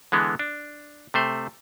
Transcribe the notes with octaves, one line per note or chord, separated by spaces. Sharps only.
D3 E3 G#3 B3
D4
C3 A3 C5